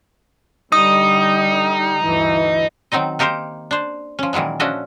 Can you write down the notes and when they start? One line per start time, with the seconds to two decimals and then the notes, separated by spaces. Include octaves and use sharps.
0.72 D3 G3 D#4 D#6
2.03 D2 G2 E3
2.92 D#3 F#3 C4 D#4 D#5
3.19 A#3 D#4 G4 A#4 C5
3.71 D4 C5
4.19 F3 C#4
4.33 A#2 D#3 E3 F#3 G#3
4.60 F3 C#4 D4 F#4 D#5 E5